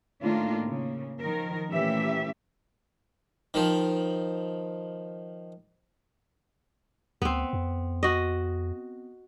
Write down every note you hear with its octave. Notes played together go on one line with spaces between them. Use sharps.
A2 D#3 A#3 D4 F4
C#3 A#3
D#3 F3 A#4
A#2 E3 A3 C#4 G4 E5
D#3 F3
D2 B3 C4
F2
F#4 D#5